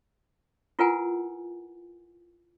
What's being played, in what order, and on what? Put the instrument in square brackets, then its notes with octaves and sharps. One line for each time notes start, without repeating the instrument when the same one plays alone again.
[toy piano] E4 F4 A#4 B4 F#5 G#5